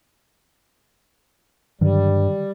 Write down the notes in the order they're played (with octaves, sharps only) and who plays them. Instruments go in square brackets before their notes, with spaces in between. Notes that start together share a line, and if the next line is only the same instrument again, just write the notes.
[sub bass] G2 [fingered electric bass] D3 D#3 F#3 [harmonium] G3